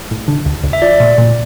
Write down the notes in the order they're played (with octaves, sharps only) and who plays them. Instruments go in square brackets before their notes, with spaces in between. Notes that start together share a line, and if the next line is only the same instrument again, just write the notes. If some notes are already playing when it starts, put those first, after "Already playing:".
[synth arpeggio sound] A2
D3
D2
D2
[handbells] E5
[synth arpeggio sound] F3 [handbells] D5
[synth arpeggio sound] A#2
A#2